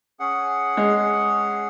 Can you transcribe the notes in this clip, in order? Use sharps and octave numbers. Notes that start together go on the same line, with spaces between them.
C#4 G#4 F#5
G#3